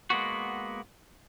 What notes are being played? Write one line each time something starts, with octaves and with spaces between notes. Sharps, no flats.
G#3 A#3 B3 F#4